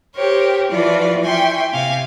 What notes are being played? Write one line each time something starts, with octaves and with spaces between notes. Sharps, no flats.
G4 A#4 C5 C#5
E3 F3 F4 F#4 B4 D5
E5 G5 G#5 C6 C#6
C3 F5 G#5